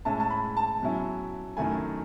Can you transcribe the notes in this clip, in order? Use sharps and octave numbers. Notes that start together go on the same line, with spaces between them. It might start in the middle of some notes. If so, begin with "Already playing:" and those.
A2 G#3 C#4 E4 A5
A5
B5
A5
B2 F#3 C#4 E4
F#2 D#3 A3 E4 G#5